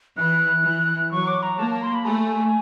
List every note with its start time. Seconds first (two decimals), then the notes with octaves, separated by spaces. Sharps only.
0.17 E3 F#6
0.65 E3
1.11 F#3 C#6
1.27 D6
1.43 A#5
1.58 A#3 A5
1.71 A5
1.83 C6
1.94 B5
2.06 A3 G#5